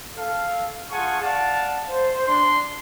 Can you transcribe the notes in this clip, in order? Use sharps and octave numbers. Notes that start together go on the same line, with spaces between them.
A4 F5
F4 G#4 F#5 G#5 A5 C#6
D5 F5 F#5 A5
C5
D4 C6